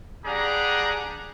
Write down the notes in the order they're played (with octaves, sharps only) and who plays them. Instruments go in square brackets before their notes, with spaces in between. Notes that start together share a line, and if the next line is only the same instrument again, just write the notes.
[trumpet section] G3 D4 G4 G#4 F#5 A#5